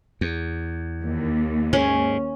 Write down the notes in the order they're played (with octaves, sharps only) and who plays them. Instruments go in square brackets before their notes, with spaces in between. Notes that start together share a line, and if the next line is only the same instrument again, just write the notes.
[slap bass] E2
[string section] D#2
[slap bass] G#2 [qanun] C#4